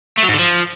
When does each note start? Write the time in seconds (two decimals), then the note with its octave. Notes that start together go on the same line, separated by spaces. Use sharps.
0.18 A3
0.23 F#3
0.28 G#2
0.34 D3
0.39 F3